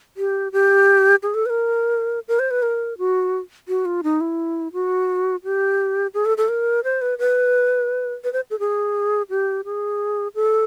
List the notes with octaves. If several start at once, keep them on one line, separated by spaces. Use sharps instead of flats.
G4
G4
G#4
A4
B4
A#4
A#4
C5
B4
A#4
F#4
F#4
F4
D#4
E4
F#4
G4
G#4
A4
A4
A#4
C5
B4
B4
B4
C5
A4
G#4
G4
G#4
A4